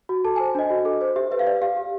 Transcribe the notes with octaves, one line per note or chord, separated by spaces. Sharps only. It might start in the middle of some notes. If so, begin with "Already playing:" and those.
F#4
A4 A5
G#5
C5
D4 D#5
F#4
A4
C5
G4 E5
B4 E5
F5
D5
G4 F5
G4